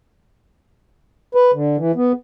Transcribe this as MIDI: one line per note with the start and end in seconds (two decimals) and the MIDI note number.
1.35 1.51 71
1.53 1.77 50
1.77 1.92 52
1.95 2.12 59